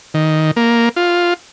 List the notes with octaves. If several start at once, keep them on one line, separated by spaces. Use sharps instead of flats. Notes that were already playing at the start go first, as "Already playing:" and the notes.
D#3
A#3
F4